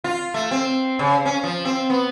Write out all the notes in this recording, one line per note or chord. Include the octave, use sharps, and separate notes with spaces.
F4
A3
C4
C#3
C#4
F3
C4
B3